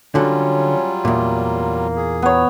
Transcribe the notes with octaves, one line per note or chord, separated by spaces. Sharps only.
D3 F#3 G3 C#4 F4 F#4 A4
E2 A#2 A#3
G#4
B3 C#5